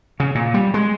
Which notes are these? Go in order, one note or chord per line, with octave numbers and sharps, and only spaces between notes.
C#3
A#2
G3
G#3